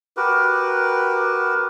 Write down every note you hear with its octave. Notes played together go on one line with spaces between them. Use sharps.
F#4 G4 A#4 B4